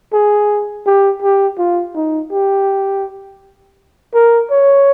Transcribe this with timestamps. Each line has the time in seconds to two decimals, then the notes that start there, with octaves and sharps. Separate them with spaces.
0.13 G#4
0.86 G4
1.22 G4
1.58 F4
1.95 D#4
2.31 G4
4.14 A#4
4.51 C#5